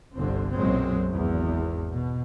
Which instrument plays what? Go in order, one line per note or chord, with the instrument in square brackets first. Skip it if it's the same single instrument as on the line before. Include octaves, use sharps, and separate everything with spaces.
[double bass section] G1 C2 D3 C4
B1 F#2 A#2 F#3 G#3 C4
G#1 E2
B2